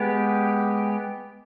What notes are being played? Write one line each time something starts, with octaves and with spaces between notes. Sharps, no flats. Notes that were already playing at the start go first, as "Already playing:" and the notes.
Already playing: G#3 B3 G4